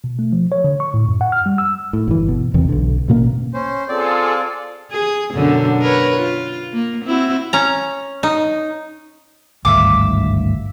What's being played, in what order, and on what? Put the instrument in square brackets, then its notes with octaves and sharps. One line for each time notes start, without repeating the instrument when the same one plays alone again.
[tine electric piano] B2
A3
F3
C#5
D3
C#6
A2
F#2
F#5
F6
G3
E6
[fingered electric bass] A2
G1 E3
B2
E2 C3 E3
B1 D3
A1 B2 A#3 C#4
[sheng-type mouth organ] C#4 C5
[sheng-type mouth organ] C4 D5 [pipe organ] F4 G#4 A4
[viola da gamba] G#4
F#2 B2 D3
A#4 B4 C#5
F4
A#3
C4 E4 F#4
[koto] C#4 A#5
D#4
[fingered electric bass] G#1 D2 G2 [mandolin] E5 F5 D6